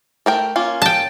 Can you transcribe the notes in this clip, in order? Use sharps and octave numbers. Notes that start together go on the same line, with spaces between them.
A3 A#4 G5
A#3 C#4 F4
G5 A5